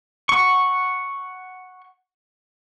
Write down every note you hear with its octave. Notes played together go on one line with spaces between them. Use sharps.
F#5 C#6